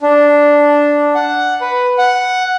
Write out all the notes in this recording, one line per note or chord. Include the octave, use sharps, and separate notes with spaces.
D4
F#5
B4
F#5